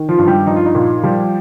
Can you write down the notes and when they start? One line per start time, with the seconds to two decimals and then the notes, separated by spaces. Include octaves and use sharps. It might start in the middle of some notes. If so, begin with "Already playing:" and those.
Already playing: D#3
0.09 F3 F4
0.18 G2
0.27 G3 G4
0.47 F3 D#4
0.56 F4
0.66 D#4
0.75 A#2
1.03 F3 G3 G4